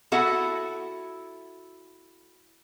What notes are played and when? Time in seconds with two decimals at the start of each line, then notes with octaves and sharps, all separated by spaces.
0.12 B3 E4 F#4 A4 E5 F#5